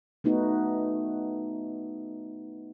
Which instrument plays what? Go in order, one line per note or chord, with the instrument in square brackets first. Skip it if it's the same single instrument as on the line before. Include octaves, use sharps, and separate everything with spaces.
[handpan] A3 B3 D#4 F#4